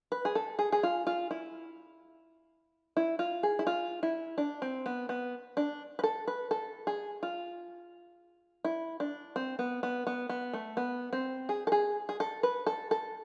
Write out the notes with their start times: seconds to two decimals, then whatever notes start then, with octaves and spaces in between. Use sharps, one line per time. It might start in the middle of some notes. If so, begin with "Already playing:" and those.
0.12 B4
0.25 G#4
0.35 A4
0.59 G#4
0.72 G#4
0.83 F4
1.07 F4
1.31 E4
2.97 E4
3.19 F4
3.43 G#4
3.59 E4
3.67 F4
4.03 E4
4.38 D4
4.62 C4
4.86 B3
5.09 B3
5.57 D4
5.99 B4
6.03 A4
6.27 B4
6.51 A4
6.87 G#4
7.23 F4
8.64 E4
9.00 D4
9.36 C4
9.59 B3
9.83 B3
10.07 B3
10.29 B3
10.53 A3
10.77 B3
11.13 C4
11.49 G#4
11.67 A4
11.72 G#4
12.09 G#4
12.20 A4
12.43 B4
12.66 A4
12.91 A4